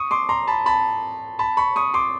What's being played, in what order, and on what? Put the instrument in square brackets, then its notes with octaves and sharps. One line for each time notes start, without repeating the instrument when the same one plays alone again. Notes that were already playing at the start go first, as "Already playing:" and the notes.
Already playing: [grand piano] C#6 D#6
C6 D6
A#5 C6
A5 B5
A5 B5
A5 B5
B5 C#6
C#6 D#6
C6 D6